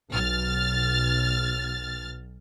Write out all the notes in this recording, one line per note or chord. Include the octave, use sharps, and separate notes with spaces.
B1 F6 A6